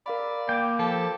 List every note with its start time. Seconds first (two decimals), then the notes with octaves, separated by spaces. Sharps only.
0.06 A#4 D5 F5 B5
0.49 A#3 G5 D6
0.79 F3 G4 A4